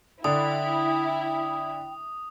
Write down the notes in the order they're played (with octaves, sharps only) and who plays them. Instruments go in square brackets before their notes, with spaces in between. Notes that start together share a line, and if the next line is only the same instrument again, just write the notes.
[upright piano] D3 D4 [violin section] E4 [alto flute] G5 [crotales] D#6